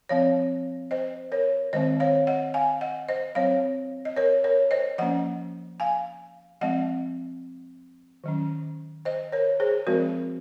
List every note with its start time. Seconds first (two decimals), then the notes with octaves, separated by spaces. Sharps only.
0.09 F3 C4 C#5 F5
0.91 C5 D#5
1.32 A#4 C#5
1.73 D#3 G#3 C4 C5 D#5
2.00 C#5 F5
2.27 D#5 F#5
2.54 F5 G#5
2.81 D#5 F#5
3.09 C5 D#5
3.35 F#3 C4 C#5 F5
4.05 D#5
4.16 A#4 C#5
4.44 A#4 C#5
4.71 C5 D#5
4.98 F3 A#3 C#4 D#5 F#5
5.80 F5 G#5
6.61 F3 G#3 C4 D#5 F#5
8.24 D#3 F#3 C#4
9.05 C5 D#5
9.32 A#4 C#5
9.60 G#4 C5
9.87 F3 G#3 C4 F#4 A#4